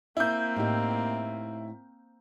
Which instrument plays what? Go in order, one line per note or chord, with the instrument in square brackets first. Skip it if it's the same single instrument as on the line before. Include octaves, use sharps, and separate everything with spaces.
[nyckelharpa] A#3 C4 [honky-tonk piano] E4 G6
[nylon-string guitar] A2 D#4 G4